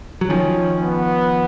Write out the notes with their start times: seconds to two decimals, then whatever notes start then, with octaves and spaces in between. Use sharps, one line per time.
0.21 F#3
0.29 D#3 F3 C#4
0.81 B3